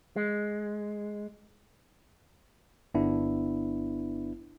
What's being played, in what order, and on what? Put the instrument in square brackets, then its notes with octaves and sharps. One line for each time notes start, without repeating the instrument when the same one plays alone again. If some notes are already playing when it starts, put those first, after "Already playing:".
[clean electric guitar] G#3
[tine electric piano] G1 B3 D4 E4